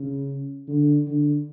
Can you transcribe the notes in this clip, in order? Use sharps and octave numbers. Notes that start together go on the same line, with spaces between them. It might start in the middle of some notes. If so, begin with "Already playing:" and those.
Already playing: C#3
D3
D3